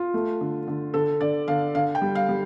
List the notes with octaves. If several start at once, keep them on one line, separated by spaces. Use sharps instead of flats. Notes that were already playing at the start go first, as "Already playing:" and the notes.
Already playing: F4
A3
D3
D3
D3 A4
D3 D5
D3 F5
D3 F5
G5
G3
F5
G3